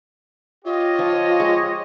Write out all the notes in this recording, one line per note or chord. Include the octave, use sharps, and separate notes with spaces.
F4 G4 C#5 D#5
F3
G#3